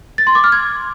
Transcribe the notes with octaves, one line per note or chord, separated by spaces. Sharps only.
A6
C6
D6
F6
G#6